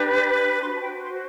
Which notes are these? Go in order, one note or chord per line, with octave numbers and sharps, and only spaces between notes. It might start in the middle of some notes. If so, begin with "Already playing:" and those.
Already playing: D4 G4 B4
F#4 C5 C6
A5
G5
C6